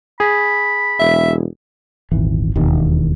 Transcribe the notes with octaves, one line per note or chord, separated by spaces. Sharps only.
G#4 B5
E1 E5
D#1 G#1 E3
E1 D#2 D#3